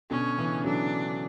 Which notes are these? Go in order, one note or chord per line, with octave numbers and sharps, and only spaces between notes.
B2 D3 C#4
C#3 E3
D3 F#3 D4